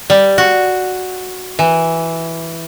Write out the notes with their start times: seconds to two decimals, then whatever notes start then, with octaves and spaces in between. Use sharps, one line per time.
0.10 G3
0.38 F#4
1.59 E3